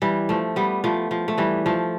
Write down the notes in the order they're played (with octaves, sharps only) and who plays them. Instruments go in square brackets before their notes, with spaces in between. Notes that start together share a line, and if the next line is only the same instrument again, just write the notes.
[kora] E3 G3
F3 A3
G3 B3
F3 A3
F3
A3
E3 G3
F3 A3